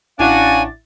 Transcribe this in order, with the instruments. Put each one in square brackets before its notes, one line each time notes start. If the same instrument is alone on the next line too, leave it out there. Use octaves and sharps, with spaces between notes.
[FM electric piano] A1 E4 A6 [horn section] C#4 D4 F#4 [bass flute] F5 [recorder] G#5